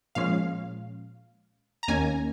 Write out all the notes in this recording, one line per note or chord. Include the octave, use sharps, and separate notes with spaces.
A#2 F3 G#3 C#4 F5
A#5
D#2 D#3 A#3 C#4 G#5